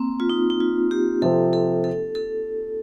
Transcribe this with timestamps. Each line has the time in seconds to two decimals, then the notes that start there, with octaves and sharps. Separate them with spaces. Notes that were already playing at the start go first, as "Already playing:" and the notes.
Already playing: A#3 C4
0.20 F4
0.30 D#4
0.50 D#4
0.60 F4
0.91 G4
1.22 C3 F3 C4 A4
1.53 A4
1.84 A4
2.15 A4